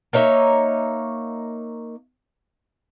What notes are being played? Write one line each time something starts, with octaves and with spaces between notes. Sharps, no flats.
A#3 D#4 C#5 E5